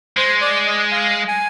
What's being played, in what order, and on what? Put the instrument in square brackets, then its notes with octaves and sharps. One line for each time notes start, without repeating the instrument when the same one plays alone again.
[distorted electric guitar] G#3 [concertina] C5
[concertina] D5
D#5
F5
G#5